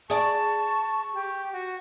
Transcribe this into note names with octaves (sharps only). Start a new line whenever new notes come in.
G#4 D5 A5 C#6
G4
F#4